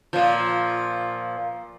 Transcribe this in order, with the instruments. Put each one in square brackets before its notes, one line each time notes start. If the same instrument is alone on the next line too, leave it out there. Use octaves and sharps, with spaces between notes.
[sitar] A#2 F3